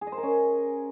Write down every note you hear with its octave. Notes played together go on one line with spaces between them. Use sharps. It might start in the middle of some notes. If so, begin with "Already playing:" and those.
G#4
D#5
C5
A#4
C#4